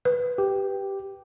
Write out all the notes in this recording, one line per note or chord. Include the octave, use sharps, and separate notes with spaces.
B4
G4